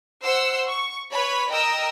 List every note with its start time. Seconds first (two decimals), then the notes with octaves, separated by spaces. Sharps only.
0.23 C5 F#5 C6 E6
0.68 C#6
1.12 B4 C#5 B5
1.52 A#4 D#5 G5 D#6 E6